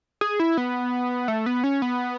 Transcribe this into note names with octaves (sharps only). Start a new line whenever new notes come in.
G#4
E4
B3
A3
B3
C#4
B3